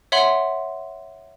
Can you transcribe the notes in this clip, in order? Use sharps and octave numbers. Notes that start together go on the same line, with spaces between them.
C#5 E5 F#5 C6 F#7